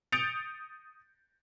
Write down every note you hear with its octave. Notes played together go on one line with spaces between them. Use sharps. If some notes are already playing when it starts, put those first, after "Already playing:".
D#6 G6 A6 C#7 D7 F7